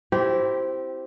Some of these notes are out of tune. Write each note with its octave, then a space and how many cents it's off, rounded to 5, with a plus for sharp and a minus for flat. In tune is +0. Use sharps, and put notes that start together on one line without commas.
C4 +0 E4 +0 G4 -20